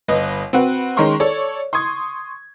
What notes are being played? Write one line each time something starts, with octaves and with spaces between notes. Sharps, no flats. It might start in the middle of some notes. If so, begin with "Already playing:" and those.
G1 B4 D#5
C4 F#4 B4
D#3 G#3 C#4 A#4 C6 C#6
A4 C#5 D5
C6 C#6 D#6 G#6